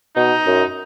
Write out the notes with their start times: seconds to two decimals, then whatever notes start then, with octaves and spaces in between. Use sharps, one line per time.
0.16 B2 D#4
0.47 F#2